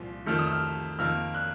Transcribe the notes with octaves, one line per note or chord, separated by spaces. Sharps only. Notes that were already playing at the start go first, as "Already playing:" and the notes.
Already playing: C2 A#2 F3
F2 D#3 A3 F6
D#6
F6
F2 D#3 A#3 F6
F#6